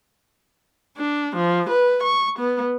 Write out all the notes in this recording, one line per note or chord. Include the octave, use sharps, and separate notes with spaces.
D4
F3
B4
C#6
B3